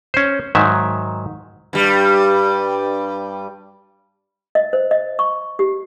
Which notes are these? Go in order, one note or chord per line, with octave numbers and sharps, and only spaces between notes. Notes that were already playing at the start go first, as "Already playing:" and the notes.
C#4 C5
G#2 D#3 F#3 E5
G2 G3
D#5
C5
D#5
C#6
G4